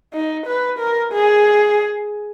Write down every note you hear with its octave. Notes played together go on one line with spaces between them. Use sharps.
D#4
B4
A#4
G#4